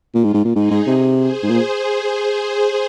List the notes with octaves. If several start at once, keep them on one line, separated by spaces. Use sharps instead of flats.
A#2
G#2 F4
G#2
A#2
G#2 D#4 G#4
G#2
C3
G#4 C5
G#2
A#2